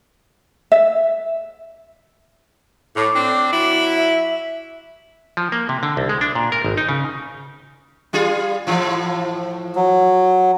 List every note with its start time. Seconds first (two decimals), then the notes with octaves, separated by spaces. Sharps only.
0.72 E5
2.95 A2 D6
3.15 C4 D4
3.52 F#3 E4
3.96 E5
5.37 F3
5.52 A#3
5.69 C3
5.83 D3
5.97 C2
6.09 G#3
6.21 D4
6.35 A#2
6.52 A#4
6.65 G#1
6.77 D#4
6.89 C#3
8.13 G3 F4 G#4
8.67 A2 E3 F3
9.76 F#3